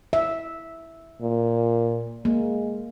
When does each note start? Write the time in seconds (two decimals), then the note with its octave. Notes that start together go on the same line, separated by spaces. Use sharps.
0.13 E5
1.22 A#2
2.25 G#3 A#3